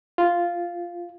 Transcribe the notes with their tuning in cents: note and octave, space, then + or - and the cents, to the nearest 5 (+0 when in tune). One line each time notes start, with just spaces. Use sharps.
F4 -5